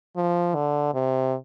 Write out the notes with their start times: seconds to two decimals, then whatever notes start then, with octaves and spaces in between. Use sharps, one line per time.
0.16 F3
0.55 D3
0.94 C3